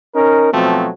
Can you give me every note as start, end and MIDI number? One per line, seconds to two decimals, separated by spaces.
0.15 0.50 61
0.15 0.50 63
0.15 0.50 70
0.53 0.90 47
0.53 0.90 53
0.53 0.90 54
0.53 0.90 57
0.53 0.90 60